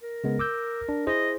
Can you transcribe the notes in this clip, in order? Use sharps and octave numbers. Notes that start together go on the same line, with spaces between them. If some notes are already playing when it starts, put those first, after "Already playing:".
A#4
C#3 G#3 B3
D6 E6 G6
D4
E4 G#4 C5 D#5